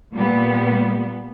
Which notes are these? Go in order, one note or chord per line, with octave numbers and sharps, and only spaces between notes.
A#2 G3 B3